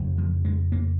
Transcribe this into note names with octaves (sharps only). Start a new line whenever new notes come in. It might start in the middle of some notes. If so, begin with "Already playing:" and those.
Already playing: F2 C#3
F3
G#3
A#3